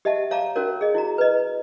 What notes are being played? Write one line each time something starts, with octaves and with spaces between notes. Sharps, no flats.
G4 D#5 E5 F#5 A5
C#5 F5 A5 A#5 D6
C#4 F#4 A#4 C#5
G#4 D#5
E4 F#4 A#5
B4 D#5